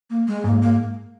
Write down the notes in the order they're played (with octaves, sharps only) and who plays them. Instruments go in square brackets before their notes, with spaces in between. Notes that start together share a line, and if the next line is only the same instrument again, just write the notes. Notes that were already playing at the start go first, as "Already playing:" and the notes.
[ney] A#3
G#3
[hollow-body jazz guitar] G#2 [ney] A#3
[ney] A#3